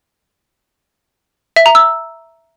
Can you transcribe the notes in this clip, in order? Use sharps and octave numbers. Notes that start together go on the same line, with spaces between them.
E5
A#5
E6